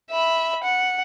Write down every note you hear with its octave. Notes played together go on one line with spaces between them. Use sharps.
E5 B5
F#5